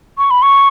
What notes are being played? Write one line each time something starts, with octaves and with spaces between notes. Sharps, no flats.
C#6
B5
C#6